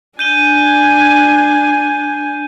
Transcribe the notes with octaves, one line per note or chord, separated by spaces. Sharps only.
D4 G#5 G6 D#7 G7